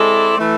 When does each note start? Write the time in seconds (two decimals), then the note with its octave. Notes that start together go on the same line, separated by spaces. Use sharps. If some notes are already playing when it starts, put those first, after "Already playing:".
Already playing: G#3 C4 E4 A4 D5
0.38 E3 A3